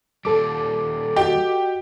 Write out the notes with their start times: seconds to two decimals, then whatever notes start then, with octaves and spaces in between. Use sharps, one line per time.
0.25 D#2 G3 A4 D6
1.16 F#4 G4 D#5